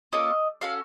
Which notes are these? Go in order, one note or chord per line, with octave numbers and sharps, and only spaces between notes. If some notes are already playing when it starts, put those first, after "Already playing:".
A#3 C#4 F4 A4 D#5
C#4 F#4 A4 F5